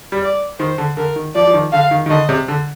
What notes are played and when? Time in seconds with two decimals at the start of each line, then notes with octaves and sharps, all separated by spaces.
0.12 G3
0.22 D5
0.59 D#3 C5
0.78 D3
0.97 D3 A#4
1.16 D#3
1.35 F3 D5
1.47 F3
1.54 D#3
1.72 D3 F5
1.91 D#3
2.06 D#3
2.10 D3 D#5
2.29 C3
2.48 D3